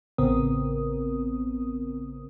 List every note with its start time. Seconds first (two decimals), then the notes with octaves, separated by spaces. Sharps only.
0.18 A1 C#3 B3 C4 A#4 D#6